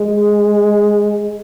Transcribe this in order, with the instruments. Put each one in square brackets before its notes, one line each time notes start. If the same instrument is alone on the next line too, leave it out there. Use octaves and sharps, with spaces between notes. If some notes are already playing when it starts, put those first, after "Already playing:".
Already playing: [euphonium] G#3